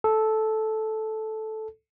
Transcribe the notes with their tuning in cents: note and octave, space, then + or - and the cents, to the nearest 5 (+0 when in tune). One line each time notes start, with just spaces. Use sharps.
A4 -10